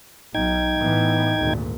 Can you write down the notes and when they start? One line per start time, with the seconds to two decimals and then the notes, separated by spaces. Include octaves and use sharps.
0.35 B1 D#4 G5 G#6
0.79 A2 E3 B3
1.39 G#1 D2 A#2